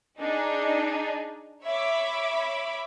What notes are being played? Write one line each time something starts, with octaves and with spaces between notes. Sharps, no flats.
D4 D#4 G#4
C#5 E5 B5 D6